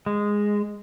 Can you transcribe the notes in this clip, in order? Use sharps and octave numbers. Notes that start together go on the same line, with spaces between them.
G#3